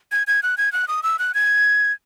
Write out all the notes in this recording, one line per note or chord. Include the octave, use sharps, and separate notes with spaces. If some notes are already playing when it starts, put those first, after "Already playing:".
G#6
G#6
F#6
G#6
F#6
D#6
E6
F#6
G#6